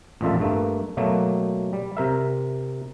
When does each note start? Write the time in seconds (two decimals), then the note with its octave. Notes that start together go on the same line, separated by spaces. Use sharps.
0.21 A1 F2 A#2 F4 A4 E5
0.39 G2 A3 A#3
0.97 B2 F#3 A3 A#3
1.73 G3
1.97 C3 A#4 E5